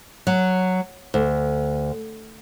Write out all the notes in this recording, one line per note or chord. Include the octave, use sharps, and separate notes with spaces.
F#3
D2